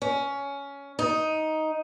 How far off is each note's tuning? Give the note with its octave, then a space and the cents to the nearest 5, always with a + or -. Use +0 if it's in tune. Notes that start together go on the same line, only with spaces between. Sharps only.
C#4 +15
D#4 +10